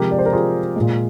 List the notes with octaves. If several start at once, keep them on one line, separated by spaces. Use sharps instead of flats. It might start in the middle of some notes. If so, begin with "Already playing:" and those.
Already playing: C3 F3 G#3 G4 A#4
D5
C5
A#4
F4 G#4
A#2 G#3